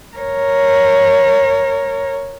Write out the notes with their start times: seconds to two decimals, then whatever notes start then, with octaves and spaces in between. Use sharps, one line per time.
0.17 A#4 C#5